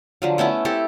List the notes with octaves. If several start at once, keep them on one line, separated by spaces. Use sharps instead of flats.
D3 F3 F#3
A3 B3 C#4 E4
C4 E4 G4 A4